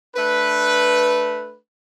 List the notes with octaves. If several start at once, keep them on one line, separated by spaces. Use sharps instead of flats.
A3 D4 B4